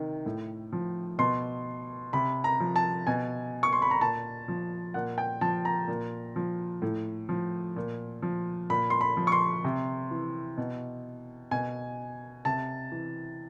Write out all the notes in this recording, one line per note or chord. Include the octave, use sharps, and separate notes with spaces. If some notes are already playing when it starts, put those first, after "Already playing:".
Already playing: C3 D#3
A2
F3
B2 C6
C3 B5
A#5
F3
A5
B2 G#5
C#6
C6
B5
A#5
A#2 A5
F3
A#2 F#5
G5
F3 A5
A#5
A#2
F3
A2
F3
A#2
F3
A#2 B5
C6
B5
F3
C#6
C6
C3
E3
B2
B2 G#5
C3 A5
E3